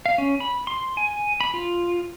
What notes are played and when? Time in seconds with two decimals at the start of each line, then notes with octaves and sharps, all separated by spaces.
0.06 F5
0.18 C#4
0.40 B5
0.67 C6
0.97 G#5
1.41 B5
1.54 F4